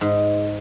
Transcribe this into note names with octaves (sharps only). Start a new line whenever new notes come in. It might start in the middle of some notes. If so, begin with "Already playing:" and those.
G#2